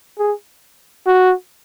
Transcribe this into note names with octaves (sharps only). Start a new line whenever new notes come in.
G#4
F#4